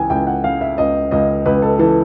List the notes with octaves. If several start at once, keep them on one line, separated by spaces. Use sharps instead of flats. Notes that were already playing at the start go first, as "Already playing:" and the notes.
Already playing: C#2 E3 G5 G#5
C#2 G5
F#5
C#3 F5
E5
C#2 D#5
C#2 D#5
C#2 B4
A4
E3 A4